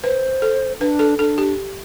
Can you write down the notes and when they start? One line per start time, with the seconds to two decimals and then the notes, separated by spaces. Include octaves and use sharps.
0.04 B4 C5
0.42 A4
0.80 D4 B4
0.99 A4
1.19 D4 A4
1.38 G4